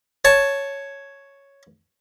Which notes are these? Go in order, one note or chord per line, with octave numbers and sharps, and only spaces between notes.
C#5 A5